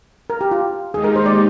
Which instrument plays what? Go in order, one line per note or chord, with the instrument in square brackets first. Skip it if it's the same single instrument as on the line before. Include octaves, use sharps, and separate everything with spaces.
[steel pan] A#4
G4
F4
[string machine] D#2 D#3 G#3 D#4 G4 [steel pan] G#4
[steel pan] A#4
C5
D5